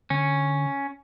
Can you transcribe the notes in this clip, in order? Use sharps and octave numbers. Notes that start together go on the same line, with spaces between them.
D3 C#4